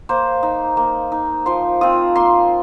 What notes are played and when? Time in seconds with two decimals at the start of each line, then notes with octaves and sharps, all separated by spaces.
0.09 A#3 C5
0.43 D#4
0.77 A#3
1.12 D#4
1.46 F3 C6
1.81 C4 F4 D#6
2.16 A#3 C6